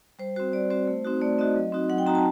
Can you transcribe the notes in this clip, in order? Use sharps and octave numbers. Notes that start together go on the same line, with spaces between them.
G3 C5
C4 F#4 C5
G3 D5
C4 F#4 C5
A3
C4 D#4 F#4
A3 D5
C4 D#4 F#4 D#5
F#3
C4 D#4 F#4
F#3 F#5
G5
C4 D#4 F#4 A#5
A5